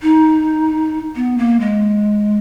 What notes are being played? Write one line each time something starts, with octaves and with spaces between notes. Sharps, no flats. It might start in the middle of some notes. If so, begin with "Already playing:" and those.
D#4
B3
A#3
G#3